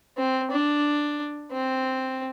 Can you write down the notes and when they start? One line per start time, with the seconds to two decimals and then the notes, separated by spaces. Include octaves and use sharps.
0.18 C4
0.51 D4
1.52 C4